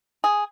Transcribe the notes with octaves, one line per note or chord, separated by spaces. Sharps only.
G#4